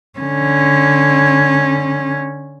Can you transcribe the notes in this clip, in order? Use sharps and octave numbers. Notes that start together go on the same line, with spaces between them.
D3 C#4